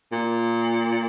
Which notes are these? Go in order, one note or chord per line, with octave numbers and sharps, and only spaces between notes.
A#2